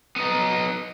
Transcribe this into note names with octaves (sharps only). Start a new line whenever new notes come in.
B3 D#4